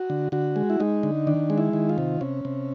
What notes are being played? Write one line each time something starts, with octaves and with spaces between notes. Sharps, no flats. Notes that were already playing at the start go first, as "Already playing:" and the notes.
Already playing: F#4
D3
D3 F#4
G#3
E4
G#3 D#4
D3
D#3 D4
G#3
E4
D#3
F4
C3
C3 C#4
C3